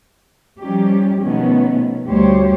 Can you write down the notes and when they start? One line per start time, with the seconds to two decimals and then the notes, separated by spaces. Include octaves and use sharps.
0.61 F3 G3 C#4 D#4 G4
1.21 B2 D#3 F3 A3 B3 C#4
2.08 D2 G3 G4 C5 C#5